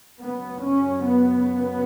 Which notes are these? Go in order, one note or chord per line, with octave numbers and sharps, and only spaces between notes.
F#2 C#3 B3
C#4
B3